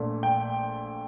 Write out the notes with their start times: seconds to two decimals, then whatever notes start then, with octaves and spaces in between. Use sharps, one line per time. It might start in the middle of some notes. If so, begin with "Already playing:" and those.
Already playing: A#1 A#2 A3
0.23 G5